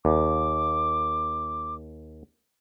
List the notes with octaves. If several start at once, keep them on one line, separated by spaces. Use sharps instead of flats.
D#2 D6